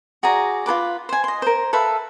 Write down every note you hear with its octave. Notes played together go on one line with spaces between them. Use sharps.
F#4 G#4 D5 A#5
F4 A4 B4 D6
C5 G#5
D#5 C6
A#4 C5
A4 B4 E5 F5